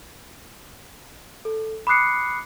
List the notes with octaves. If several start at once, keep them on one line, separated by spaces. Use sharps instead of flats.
A4
B5 D6 D#6 F#6 C7 C#7